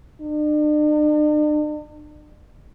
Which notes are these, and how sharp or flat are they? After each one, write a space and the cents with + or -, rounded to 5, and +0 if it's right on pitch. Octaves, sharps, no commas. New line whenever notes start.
D4 +45